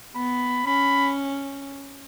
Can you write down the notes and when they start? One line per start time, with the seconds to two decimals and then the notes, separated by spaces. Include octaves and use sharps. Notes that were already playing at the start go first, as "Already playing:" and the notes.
0.16 B3 B5
0.67 C#4 B5